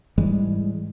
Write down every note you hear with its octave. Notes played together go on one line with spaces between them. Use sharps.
G#2 E3 G3 G#3